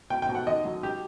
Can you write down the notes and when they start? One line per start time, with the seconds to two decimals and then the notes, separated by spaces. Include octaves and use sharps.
0.10 B2 G5
0.22 G5
0.29 B2
0.35 F#5
0.47 D#2 D#5
0.65 F#3
0.83 G4